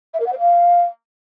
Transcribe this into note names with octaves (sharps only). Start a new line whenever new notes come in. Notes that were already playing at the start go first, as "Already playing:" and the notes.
E5
A#4
F#5
C5
F5